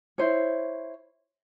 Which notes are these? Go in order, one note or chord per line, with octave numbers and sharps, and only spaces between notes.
E4 C5 C#5